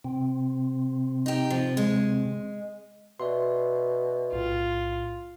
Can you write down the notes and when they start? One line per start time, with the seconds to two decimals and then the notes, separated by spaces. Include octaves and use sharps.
0.04 C3 C4
1.26 D#4 G4
1.50 F3
1.77 G#3
3.20 B2 D5 E5 C6
4.33 B1 A2 F4